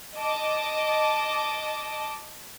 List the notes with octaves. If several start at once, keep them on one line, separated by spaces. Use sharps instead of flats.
D#5 A5 D6